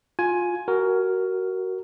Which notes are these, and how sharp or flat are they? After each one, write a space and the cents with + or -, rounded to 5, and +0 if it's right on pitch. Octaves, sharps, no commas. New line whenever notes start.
F4 +20 G#5 +10
F#4 +20 A#4 +0